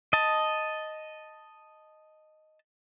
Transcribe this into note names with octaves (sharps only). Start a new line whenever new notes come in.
D#5 A5